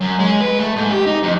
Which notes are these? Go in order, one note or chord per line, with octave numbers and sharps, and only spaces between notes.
F#2
G#3
B4
A3
G#2
G4
D#4
F2